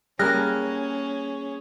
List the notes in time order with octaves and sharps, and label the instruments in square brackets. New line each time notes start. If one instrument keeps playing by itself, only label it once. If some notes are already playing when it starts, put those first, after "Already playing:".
[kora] G3 A#3 A#4 [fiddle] C#4 [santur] G#4 [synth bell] F6 F#6 A#6